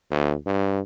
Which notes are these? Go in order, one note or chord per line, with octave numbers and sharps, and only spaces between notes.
D2
G2